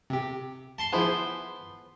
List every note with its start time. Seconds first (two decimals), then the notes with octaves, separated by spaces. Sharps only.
0.10 C3 G4
0.78 A5 C6
0.92 F3 B3 E4 G#4 C5